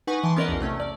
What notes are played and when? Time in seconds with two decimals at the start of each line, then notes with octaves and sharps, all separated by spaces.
0.07 D#4 B4 F#5 G#5 C#6
0.24 E3 A5 C6
0.36 B3 C#4 A#4 D5 D#5 F#5
0.48 B1 E2
0.61 C3 A3 C#4
0.80 D5